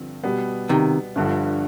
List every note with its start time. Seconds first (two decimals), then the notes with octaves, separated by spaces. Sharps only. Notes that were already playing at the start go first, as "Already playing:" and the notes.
Already playing: G2 D3 F3 C4
0.24 B2 G3 B3
0.69 C3 D#3
1.16 G1 G2 D3 F3